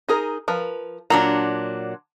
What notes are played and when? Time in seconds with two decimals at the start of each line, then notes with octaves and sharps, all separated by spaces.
0.09 D#4 G#4 A#4
0.48 F3 A#4 B4
1.10 A#2 F#3 D4 A#5